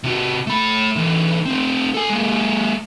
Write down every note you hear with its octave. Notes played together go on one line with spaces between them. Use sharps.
C3 F#4
A3 B5
D3 E3
A3 C4
A4 G#5
G#3 A#3